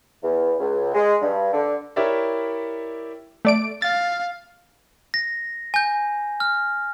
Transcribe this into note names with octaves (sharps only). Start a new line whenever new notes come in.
E2
C#2
G#3
G2
D3
E4 G4 A#4 C#5 D5 E5
A3 D5 D7
F5 A6
A#6
G#5 G6
F6